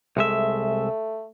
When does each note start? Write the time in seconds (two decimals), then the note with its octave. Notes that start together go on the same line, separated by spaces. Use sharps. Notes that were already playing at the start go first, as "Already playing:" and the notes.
0.17 C2 G#3 A3 E5